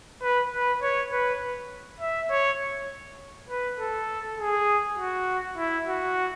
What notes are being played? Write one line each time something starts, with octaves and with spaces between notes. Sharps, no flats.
B4
B4
C#5
B4
E5
C#5
B4
A4
G#4
F#4
E4
F#4